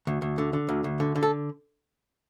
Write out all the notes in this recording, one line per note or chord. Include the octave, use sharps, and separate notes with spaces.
D2
D2
D3
D3
D2
D2
D3
D3
A4